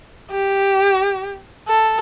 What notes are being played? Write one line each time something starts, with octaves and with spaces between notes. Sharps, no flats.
G4
A4